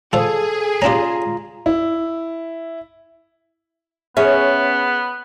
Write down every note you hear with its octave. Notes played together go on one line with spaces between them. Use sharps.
F4 G#4 A4 C5
C#4 D4 F4 G4 A#5
E4
B3 C#4 G#4 E5